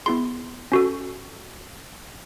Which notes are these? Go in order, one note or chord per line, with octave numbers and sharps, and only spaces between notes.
B3 E4 G#4 C6
C#4 F#4 A4